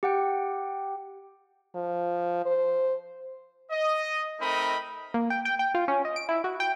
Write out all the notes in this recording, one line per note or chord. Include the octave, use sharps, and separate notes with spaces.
G4 F#5 G5
F3
C5
D#5
A3 C4 D#4 A#4 D#5 B5
A#3
G5
G5
G5
F4
C#4
D#5
D7
E4
F#4
G5